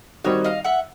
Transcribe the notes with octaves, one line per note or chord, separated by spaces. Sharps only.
D#3 G3 C4 D#4 F#4 C#5 D#5
D#5 F5
E5 F#5